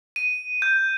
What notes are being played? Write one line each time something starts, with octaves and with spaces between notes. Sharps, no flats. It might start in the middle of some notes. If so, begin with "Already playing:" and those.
D#7
G6